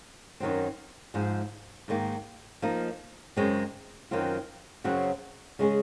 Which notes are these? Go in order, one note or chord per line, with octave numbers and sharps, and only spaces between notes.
F#2 D#3 F#3 C4
G#2 F3 G#3
G#2 D#3 A#3
F3 A#3 D#4
F#2 C#3 G#3 C4
F#2 D#3 F#3 C4 F4
F#2 C#3 F#3 C4 F#4
C#3 G#3 C#4 G#4